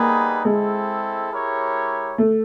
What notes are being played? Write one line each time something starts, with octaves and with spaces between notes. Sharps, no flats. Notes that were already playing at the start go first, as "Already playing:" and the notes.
Already playing: G3 A#3 B3 D#4 G#4 B4
G#3 C4 E4 A4
E4 G4 A#4 C#5
A3